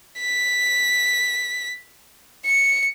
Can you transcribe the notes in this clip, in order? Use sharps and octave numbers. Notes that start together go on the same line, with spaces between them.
B6
C#7